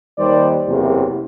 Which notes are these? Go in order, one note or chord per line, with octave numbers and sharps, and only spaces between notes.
D#2 D#3 G3 C5 D5
F#1 E2 C3